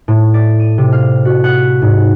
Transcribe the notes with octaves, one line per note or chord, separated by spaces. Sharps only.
A2
D5
D#7
C3
F5
F#4
F#5
G#2